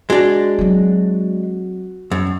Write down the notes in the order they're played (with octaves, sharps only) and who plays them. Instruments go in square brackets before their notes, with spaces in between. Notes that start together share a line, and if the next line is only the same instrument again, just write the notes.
[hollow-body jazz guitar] G#3 D4 [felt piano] F#4
[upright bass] F#3 C4
[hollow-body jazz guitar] F#2